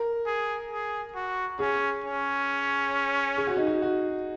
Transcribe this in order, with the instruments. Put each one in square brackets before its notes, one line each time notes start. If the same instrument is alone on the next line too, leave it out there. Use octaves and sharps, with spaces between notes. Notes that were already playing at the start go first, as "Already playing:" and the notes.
Already playing: [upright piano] A#4
[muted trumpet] G#4
G#4
F#4
[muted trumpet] C#4 [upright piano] G#4
[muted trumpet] C#4
[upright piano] G#4
F#4
D#4
F#4
F#4